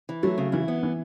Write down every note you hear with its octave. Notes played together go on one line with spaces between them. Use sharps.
E3
F#3 A3
C#3
E3 E4
B3
E3